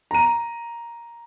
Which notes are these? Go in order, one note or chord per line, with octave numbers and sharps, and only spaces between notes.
A#5 D#7